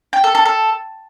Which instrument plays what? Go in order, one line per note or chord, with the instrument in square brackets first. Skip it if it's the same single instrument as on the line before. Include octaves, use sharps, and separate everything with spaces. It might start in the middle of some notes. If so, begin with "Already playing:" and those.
[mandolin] G5
A4
A4
A4